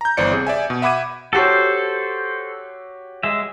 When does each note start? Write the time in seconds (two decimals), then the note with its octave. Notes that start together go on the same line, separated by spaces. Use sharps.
0.01 A#5 G6
0.17 G1 E3 C5 D5 C#7
0.31 C3 G#4
0.47 D5 E5 G#5
0.70 B2
0.82 E5 F#5 B5 D6 G#6 D#7
1.33 F#4 G4 A4 C5 C#5
3.23 G#3 E5